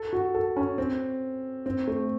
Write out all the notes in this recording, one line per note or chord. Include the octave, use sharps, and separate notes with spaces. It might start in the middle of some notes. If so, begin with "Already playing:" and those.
Already playing: A4
F#4
A4
C#4
C4
C4
A3